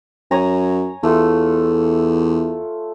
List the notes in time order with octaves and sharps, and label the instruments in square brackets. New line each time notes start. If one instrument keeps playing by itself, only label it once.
[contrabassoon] F#2 [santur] C#5 G#5 A#5
[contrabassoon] E2 [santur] A3 F4 A4